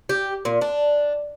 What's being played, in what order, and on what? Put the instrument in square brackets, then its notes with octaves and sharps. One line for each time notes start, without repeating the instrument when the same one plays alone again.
[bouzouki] G4
A#2
D4